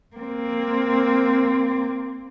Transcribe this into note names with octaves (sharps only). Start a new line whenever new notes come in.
A#3 C4